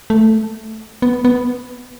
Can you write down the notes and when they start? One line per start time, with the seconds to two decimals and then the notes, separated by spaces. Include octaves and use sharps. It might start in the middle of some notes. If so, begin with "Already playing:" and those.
0.10 A3
1.02 B3
1.25 B3